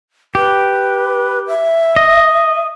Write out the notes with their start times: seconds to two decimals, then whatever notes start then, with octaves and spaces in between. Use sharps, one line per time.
0.35 G4 B4
1.48 E5
1.96 D#5